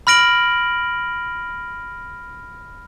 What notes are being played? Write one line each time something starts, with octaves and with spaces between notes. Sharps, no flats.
B5 F6 A#6 D7 F#7